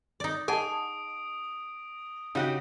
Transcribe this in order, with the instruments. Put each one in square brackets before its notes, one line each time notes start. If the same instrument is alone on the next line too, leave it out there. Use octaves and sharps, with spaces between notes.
[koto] D#4 D5
[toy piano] G#4 F#5 A5 [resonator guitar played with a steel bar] D#5 [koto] G#5 [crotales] D#6 D7
[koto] C#3 [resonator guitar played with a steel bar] D#4 F#4 G4